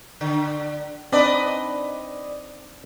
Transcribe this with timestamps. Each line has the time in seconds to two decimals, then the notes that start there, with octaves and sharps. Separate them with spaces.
0.21 D3
1.12 C4 D4 D#4 B4 D5 D#5